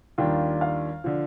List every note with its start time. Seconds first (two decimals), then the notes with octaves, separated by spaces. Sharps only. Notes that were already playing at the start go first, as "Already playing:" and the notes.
0.18 D#2 D#3 G3 D4 F4 G5
0.61 F5
1.04 D3 F3